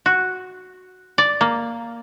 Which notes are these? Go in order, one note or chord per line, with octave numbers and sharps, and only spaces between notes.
F#4
D5
A#3